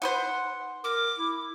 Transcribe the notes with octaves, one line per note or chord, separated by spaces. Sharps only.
D#4 B4 C5 F#5
A#4 D6
E4